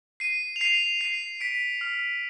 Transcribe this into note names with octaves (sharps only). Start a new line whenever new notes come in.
C7 D#7
F7
C7 D#7
C7 D#7
B6 D7
F6